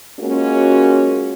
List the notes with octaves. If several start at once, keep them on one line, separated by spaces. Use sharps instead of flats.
G#3 A#3 C#4 F4 F#4